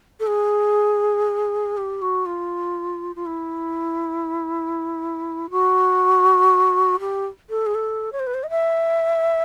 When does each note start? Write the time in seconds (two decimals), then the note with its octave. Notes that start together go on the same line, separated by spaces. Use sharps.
0.20 A4
0.27 G#4
1.77 G4
2.02 F#4
2.26 F4
3.16 F4
3.26 E4
5.50 F#4
7.00 G4
7.50 A4
7.66 G#4
7.75 A4
8.12 C#5
8.20 C5
8.27 B4
8.34 C5
8.43 D#5
8.50 E5